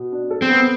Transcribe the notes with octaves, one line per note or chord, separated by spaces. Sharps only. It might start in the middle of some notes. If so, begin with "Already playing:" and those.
Already playing: B2
D4
A4
C4
B3